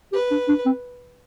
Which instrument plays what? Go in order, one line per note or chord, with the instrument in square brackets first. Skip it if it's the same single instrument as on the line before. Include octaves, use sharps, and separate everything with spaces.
[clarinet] G4 [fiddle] B4
[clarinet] D4
D4
C4